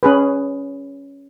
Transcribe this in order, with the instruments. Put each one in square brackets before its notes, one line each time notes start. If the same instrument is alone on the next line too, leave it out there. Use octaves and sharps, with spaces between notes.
[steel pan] C#4 G#4 B4